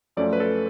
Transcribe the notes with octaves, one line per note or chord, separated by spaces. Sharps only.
F#2 F3 A3 C#4 D5
B4
A4